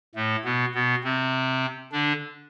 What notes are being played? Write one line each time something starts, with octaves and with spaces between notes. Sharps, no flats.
A2 A3
B2 B3
B2 B3
C3 C4
D3 D4